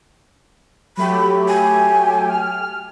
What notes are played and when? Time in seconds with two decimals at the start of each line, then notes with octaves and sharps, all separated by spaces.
0.97 F#3 A3 G4 B5
1.48 G#5
2.29 F6